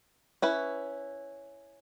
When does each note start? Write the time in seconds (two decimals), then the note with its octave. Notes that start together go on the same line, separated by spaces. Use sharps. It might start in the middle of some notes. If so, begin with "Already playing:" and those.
0.42 C#4 E4 B4